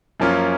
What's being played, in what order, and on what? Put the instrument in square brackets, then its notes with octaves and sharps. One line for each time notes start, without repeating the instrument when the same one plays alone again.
[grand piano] F#2 F3 A#3 C#4 F4